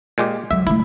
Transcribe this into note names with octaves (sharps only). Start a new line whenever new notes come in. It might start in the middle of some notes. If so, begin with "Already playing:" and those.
A#2 G#3 G4
D3 F#3 E5
C#3 A3 E4